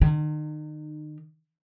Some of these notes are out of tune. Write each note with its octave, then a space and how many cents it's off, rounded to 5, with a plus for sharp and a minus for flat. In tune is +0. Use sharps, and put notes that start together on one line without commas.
D#3 -40 D#4 -30